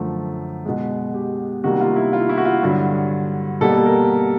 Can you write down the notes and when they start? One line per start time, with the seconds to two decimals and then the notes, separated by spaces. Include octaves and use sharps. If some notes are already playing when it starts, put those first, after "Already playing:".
Already playing: F#2 D3 F3 A3
0.65 B2 G#3
1.14 G4
1.64 C3 D#3 G3 A#3 F#4
1.81 F4
1.96 E4
2.13 F4
2.29 E4
2.37 F#4
2.45 F4
2.63 G2 D3 F#3
3.61 B2 G3 A#3 A4
3.86 A#4